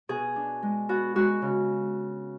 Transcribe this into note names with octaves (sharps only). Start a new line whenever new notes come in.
B2 G#4
D4
G#3
B3 F#4
G#3 F#4
C#3